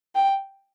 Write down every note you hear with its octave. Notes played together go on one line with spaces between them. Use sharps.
G5